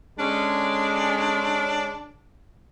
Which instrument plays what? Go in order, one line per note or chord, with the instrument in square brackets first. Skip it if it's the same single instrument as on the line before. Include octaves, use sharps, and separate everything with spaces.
[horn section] D3 G#3 C#4 [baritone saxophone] D4